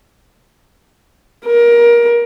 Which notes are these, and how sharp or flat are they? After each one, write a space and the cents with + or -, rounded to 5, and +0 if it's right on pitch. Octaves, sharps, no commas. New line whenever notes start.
A#4 +25